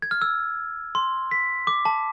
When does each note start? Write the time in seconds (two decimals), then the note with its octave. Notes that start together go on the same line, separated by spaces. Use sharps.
0.02 G#6
0.11 F6
0.22 E6
0.95 C6
1.31 B6
1.67 D6
1.85 A5